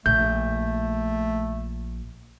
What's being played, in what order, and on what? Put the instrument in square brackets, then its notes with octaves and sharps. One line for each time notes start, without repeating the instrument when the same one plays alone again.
[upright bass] A#1 [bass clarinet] A3 [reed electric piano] G6